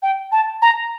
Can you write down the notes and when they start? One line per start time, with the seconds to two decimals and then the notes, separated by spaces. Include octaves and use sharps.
0.02 G5
0.32 A5
0.62 A#5